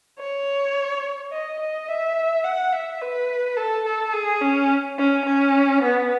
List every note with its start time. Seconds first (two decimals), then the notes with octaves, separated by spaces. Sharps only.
0.19 C#5
1.32 D#5
1.60 D#5
1.89 E5
2.44 F#5
2.73 E5
3.01 B4
3.57 A4
3.86 A4
4.13 G#4
4.41 C#4
4.98 C#4
5.26 C#4
5.83 B3